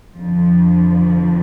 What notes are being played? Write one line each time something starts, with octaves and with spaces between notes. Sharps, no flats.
F2 D3 F3